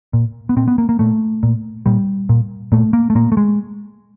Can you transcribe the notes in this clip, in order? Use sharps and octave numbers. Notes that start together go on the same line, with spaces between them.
A#2
B3
A#2 C4
B3
A#3
A#3
A#2 A3
A#2
A#2 G3
A#2
A#2 A3
A#3
A3
A#2 A#3
A3
G#3